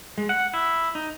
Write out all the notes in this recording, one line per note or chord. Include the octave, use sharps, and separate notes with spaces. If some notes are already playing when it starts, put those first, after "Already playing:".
G#3
F#5
E4
D#4